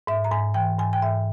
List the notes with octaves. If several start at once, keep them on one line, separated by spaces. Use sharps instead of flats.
G#2 E5
A#5
G#2 G#5
E3 G5
G#2 G#5
G5
G#2 E5